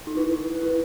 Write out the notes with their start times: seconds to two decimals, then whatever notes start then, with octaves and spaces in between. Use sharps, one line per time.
0.07 D#4
0.16 E4 B4
0.32 B4
0.47 B4
0.63 E4